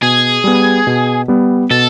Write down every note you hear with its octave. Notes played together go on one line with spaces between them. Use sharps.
B2 G#4
G3 B3
B2
G3 B3
B2 A4